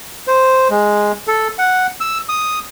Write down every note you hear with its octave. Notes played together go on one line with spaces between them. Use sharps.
C5
G#3
A4
F#5
E6
D#6